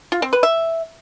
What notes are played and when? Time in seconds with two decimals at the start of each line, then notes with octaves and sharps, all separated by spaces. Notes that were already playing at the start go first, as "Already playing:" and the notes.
0.12 F4
0.22 C4
0.33 B4
0.43 E5